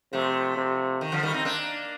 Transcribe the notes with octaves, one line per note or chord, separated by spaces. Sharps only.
C3 F3 A3
C3
D#3
D3 F3
D#3 G3
C4 D#4
A#3 D4